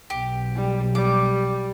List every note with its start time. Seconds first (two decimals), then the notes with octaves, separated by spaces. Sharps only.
0.10 B1 G4
0.55 G3
0.95 G3 D6